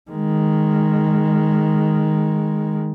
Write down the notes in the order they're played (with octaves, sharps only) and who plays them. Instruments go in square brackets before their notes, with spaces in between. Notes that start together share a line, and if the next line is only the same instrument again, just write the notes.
[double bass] D#3 G#3